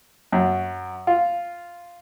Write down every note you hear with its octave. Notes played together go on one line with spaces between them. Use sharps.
F#2
F4